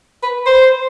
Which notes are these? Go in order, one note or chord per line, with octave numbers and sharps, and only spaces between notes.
B4
C5